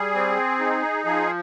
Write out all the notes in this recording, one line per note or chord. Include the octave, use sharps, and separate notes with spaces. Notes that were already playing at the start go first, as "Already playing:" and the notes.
Already playing: G3 G#4
C4
D#4
F3 G#4